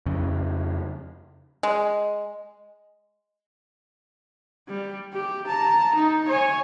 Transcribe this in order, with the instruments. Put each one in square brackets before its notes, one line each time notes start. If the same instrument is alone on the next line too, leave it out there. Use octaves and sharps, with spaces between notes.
[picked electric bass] F2 C#3
[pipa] G#3
[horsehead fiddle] G3
G4
A5 A#5
D#4
C#5 G#5